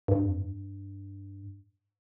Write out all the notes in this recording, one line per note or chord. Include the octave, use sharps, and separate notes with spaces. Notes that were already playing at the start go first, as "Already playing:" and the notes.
G2
F2
G2